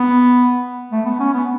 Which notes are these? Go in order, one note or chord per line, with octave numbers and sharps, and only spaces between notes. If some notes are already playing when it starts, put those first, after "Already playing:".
Already playing: B3
A3
B3
C#4
B3